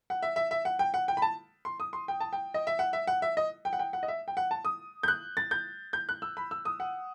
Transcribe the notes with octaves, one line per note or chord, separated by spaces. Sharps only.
F#5
E5
E5
E5
F#5
G5
F#5
G5
B5
A5
C6
D#6
C6
G5
A5
G5
D#5
E5
F#5
E5
F#5
E5
D#5
G5
F#5
G5
F#5
D#5
E5
G5
F#5
A5
D#6
G6
F#6
A6
G6
G6
F#6
E6
B5
E6
D#6
F#5